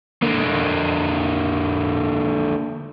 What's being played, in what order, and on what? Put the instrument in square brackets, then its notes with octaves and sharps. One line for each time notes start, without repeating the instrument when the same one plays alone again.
[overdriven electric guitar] D3 A#3